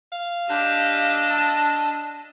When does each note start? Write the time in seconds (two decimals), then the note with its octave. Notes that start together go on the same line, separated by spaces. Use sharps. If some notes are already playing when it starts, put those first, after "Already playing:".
0.12 F5
0.50 D4 G4 D#5 E6
1.30 A5